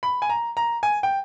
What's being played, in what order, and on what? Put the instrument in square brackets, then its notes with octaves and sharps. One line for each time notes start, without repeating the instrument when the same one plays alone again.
[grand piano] B5
G#5
A#5
A#5
G#5
G5